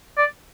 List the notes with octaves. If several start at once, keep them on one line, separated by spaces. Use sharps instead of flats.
D5